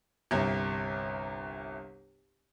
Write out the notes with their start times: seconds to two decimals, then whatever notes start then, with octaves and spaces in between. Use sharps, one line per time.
0.31 G1 C2